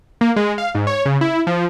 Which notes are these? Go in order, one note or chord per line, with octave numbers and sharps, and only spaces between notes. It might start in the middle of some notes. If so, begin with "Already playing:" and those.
A#3
G#3
F5
G#2
C#5
C#3
E4
F3